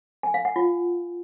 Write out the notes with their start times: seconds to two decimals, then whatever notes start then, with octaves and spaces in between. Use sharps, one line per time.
0.23 G#5
0.34 F5
0.45 F#5
0.56 F4